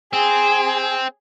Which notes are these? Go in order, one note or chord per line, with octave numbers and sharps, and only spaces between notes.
C4 G#4